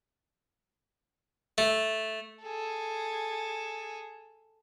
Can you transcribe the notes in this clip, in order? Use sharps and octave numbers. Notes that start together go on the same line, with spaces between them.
A3
G#4 A4